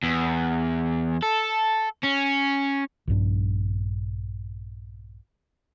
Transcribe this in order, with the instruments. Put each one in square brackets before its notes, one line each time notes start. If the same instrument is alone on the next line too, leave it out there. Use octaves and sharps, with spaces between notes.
[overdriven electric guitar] E2
A4
C#4
[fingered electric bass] A#1 G2 D4